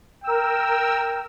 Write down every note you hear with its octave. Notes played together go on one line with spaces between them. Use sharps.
A#4 G5 E6